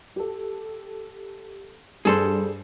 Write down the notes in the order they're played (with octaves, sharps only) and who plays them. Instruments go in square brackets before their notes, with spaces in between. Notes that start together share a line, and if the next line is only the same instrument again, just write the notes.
[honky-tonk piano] G4 A4
[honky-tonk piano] G2 [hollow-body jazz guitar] G#4 A4 C5